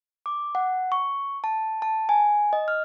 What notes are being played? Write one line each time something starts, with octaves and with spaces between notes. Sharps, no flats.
D6
F#5
C#6
A5
A5
G#5
D#5
F6